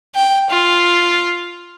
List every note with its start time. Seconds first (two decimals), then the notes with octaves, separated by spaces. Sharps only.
0.15 G5
0.50 F4